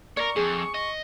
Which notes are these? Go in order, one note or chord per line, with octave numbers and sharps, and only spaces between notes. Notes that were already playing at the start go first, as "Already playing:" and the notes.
A#4 C#5 D5 C#6
F2 G#4
D#5 C#6